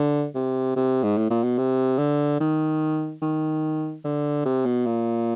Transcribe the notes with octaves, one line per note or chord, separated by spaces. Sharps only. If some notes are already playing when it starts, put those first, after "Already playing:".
Already playing: D3
C3
C3
G#2
A2
A#2
B2
C3
D3
D#3
D#3
D3
C3
B2
A#2